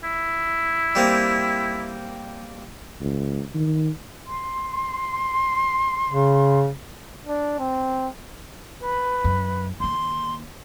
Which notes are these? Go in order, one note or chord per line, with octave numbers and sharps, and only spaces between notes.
E4
G3 A#3 C4
C#2
D#3
C6
C#3
D4
C4
B4
F#2
D#3 A#3 C6